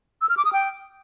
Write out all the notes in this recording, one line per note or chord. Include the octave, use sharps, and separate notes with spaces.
E6
F6
D6
D#6
G5